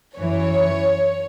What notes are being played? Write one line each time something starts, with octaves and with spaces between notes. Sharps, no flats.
F#2 E3 C#5